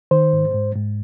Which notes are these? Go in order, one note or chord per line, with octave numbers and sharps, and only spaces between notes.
D#3 C5
G#2
G#2
G#2